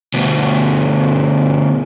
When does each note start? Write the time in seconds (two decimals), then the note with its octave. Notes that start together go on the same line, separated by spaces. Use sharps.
0.14 D2 B2